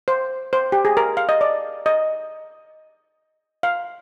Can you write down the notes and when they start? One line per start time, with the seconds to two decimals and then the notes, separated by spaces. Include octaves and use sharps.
0.08 C5
0.53 C5
0.72 G4
0.85 G#4
0.97 A#4
1.17 F5
1.29 D#5
1.41 D5
1.86 D#5
3.63 F5